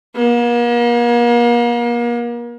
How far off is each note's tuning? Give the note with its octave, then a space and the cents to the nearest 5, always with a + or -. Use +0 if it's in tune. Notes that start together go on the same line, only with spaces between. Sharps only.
A#3 +40